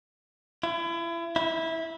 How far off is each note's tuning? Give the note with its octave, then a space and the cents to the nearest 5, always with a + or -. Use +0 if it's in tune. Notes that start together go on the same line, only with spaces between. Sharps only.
E4 +35
E4 -15